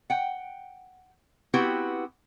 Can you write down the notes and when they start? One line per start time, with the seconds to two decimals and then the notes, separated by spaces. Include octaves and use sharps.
0.10 F#5 G5
1.54 B3 C4 E4 F#4 G4 B4